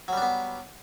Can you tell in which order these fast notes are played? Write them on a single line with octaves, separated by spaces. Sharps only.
F#3 G3 D4 B3